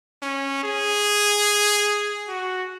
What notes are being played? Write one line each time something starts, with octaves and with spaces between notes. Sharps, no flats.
C#4
G#4
F#4